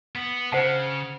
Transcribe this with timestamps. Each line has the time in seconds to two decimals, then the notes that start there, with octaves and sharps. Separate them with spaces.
0.15 B3
0.52 C#3 C5 F#5 A5